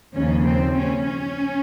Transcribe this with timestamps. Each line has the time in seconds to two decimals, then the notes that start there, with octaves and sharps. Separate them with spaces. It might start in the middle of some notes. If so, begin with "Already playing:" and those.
0.15 D#2 C#3 F3 C#4
0.45 C4
0.75 C#4
1.05 C#4